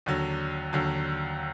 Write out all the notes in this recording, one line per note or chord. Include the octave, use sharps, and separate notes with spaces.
D#2 D3 F#3
D#2 D3 F#3